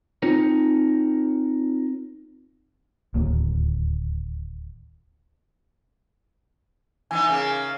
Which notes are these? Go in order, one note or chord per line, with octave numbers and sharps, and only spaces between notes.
C4 D#4 F4 A#4 C#5
D1 D#2 A#3
E3 B3 D#4 G#5
C#3 A#3